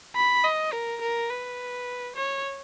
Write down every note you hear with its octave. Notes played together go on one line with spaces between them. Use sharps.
B5
D#5
A#4
A#4
B4
C#5